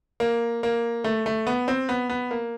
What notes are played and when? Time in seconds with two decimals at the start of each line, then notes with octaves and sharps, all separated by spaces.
0.20 A#3
0.63 A#3
1.04 A3
1.26 A3
1.47 B3
1.68 C4
1.89 B3
2.10 B3
2.31 A#3